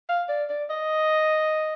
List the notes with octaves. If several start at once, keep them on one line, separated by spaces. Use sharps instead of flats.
F5
D5
D5
D#5